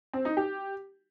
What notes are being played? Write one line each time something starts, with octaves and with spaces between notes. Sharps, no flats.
C4
D#4
G4